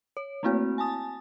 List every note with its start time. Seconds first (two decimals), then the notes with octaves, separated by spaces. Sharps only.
0.17 C#5
0.43 A3 A#3 C4 E4 F#4
0.78 G#5 A5 D#6 A6